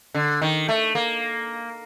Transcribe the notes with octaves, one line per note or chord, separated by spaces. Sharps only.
D3
D#3
A3
A#3